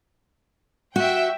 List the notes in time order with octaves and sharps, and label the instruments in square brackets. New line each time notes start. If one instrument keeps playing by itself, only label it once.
[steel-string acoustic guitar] F#4 [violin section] E5 G5